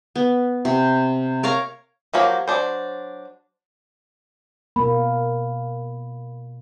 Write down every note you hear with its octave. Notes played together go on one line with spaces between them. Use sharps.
B3
C3
A#4 C#5 F5 A#5
F3 F#3 A#3 G4
F#3 D4 C5
B2 A#3 B5